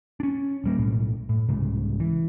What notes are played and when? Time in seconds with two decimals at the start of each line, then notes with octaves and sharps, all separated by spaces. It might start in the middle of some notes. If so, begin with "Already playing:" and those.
0.20 C#4 D4
0.64 D#1 G3 A#3
0.77 B1 A2
1.29 A2
1.49 C2 G#2 C#3
2.00 E3